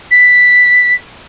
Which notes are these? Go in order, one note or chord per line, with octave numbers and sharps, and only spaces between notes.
B6